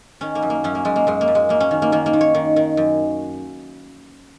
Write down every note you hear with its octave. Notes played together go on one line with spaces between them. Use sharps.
D#3 C#4
A#3
F#2
A#3
F#2 C#4
A#3
F#2 G#3
A#3
F#2 G#3
A#3
F#2
G#3
F#2 A#3
C#4
D#3
A#3
D#3 A#3
A#3
D#3
C#5
D#3
D#3
F#2